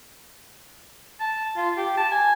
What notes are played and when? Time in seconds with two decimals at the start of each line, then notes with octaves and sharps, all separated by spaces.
1.20 A5
1.57 F4
1.77 G4
1.97 A5
2.11 G#5